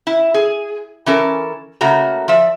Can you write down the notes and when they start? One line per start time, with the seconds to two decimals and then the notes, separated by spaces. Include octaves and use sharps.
0.07 E4
0.34 G#4
1.06 E3 C#4 A4 A#4
1.81 C#3 A3 A#3 F#4 A#5
2.28 F3 D5 E5